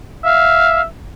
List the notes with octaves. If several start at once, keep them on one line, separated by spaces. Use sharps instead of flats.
E5 F5